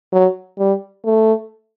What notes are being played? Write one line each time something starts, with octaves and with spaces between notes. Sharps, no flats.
F#3
G3
A3